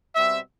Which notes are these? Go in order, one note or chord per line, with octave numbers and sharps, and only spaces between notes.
B2 G3 C4 E5